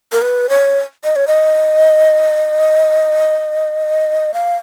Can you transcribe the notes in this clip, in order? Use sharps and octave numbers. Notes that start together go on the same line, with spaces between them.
A#4
B4
C#5
D#5
C#5
D#5
F5